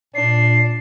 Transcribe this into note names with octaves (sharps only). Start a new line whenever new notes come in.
A#2 D4 C7